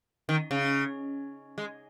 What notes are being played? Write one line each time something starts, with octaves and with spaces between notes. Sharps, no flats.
D#3
C#3
G#3